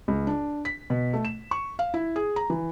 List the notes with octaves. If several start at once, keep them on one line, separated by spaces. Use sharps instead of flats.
C#2
D4
B6
B2
A3
E7
C#6
F5
E4
G#4
A#5
E3